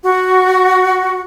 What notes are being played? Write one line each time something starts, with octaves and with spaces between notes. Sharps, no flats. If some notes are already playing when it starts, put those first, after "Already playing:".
F#4